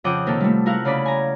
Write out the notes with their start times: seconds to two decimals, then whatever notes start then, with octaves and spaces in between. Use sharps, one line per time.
0.04 F2 C#3 F#5 G5 D6 D#6
0.26 C3 D#3 A#3 A4
0.40 G3 A3
0.66 E4 F#4 A#4 F5 F#5
0.85 C#3 C#4 D5 B5
1.05 G#5 A#5